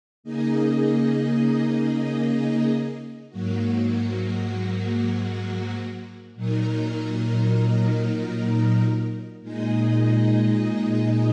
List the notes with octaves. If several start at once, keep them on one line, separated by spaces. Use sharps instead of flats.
C#3 A#3 D#4 G#4 D#5
G#2 F#3 A#3 F#4
A#2 F#3 D#4 A#4
A#2 G#3 D#4 G#4 D#5